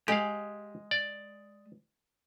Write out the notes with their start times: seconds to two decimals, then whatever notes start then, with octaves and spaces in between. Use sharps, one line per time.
0.08 G#3 G4 F5
0.91 D5